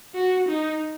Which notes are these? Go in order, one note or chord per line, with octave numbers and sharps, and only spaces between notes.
F#4
D#4